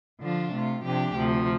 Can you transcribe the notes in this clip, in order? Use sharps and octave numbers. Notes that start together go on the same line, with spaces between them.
D3 F3 D4 F4
C3 A3 F4
C3 F3 D4 G4
D2 C3 F3